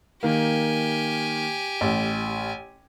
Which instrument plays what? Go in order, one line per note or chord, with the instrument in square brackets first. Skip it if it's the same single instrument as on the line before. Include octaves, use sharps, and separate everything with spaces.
[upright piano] D#3 A#3 [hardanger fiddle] G4 G#5
[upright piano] A1